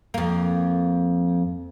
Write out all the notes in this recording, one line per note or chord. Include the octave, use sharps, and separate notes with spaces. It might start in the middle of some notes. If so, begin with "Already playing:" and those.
F2 A#3